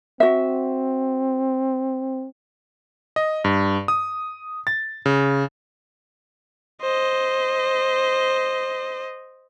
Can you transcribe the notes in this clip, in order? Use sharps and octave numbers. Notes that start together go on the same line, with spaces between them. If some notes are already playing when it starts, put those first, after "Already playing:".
C4 F#4 E5
D#5
G2
D#6
A6
C#3
C5 D#5